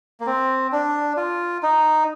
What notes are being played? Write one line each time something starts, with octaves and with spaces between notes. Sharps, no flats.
A#3
C4
D4
F4
D#4